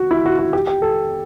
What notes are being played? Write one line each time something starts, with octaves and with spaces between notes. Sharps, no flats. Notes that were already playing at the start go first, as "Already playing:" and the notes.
Already playing: F#4
E4
F#4
F#4
G4
G4
A4